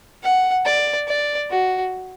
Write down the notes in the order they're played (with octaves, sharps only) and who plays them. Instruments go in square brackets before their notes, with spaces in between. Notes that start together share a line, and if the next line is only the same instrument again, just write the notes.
[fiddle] F#5
D5
D5
F#4